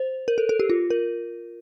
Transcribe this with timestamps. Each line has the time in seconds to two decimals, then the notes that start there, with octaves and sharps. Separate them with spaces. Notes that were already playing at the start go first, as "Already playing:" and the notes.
Already playing: C5
0.28 A#4
0.38 A4
0.49 A4
0.60 G4
0.70 F4
0.90 A#4